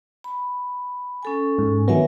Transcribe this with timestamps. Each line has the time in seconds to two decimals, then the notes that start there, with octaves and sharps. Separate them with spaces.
0.24 B5
1.23 C#4 A4 G#5
1.59 G#2
1.88 D#3 F#3 B3 A#4 E5 G#5